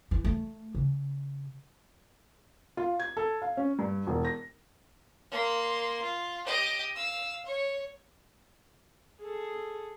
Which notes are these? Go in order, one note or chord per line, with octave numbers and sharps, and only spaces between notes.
E3
A3
C#3
F4
G#6
A4
F5
C#4
G2
E1
A#6
A#3 C6
F4
G4 D#5
F5 E6
C#5
G#4 A4